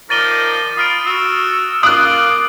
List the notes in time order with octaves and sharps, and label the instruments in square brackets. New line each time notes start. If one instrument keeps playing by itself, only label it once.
[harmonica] D#3 F3 D5 [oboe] A#4 [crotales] A6 D#7 G7
[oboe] F4 [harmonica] B5 [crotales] D#6 F6 D7
[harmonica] F#4 [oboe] E6
[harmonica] A#3 F4 [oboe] D6 [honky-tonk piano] D#6 F#6 [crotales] F#7